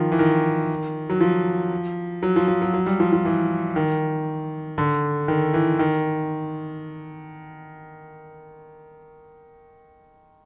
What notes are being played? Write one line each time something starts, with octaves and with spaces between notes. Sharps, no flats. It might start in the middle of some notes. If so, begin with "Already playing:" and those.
Already playing: D#3 F3
E3
D#3
F#3
F3
F#3
F3
F3
F#3
F#3
G3
F3
F3
E3
D#3
D3
D#3
E3
D#3